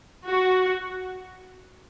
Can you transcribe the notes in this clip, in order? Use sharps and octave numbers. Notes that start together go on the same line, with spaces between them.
F#4